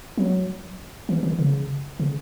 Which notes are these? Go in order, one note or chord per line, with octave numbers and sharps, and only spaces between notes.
F#3
E3
D#3
C#3
C#3